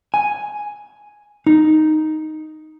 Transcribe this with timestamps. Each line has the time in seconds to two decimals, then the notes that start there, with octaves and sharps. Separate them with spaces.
0.14 G#5
1.47 D#4